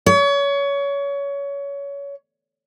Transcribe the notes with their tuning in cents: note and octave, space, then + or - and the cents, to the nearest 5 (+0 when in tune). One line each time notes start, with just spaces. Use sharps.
C#5 +25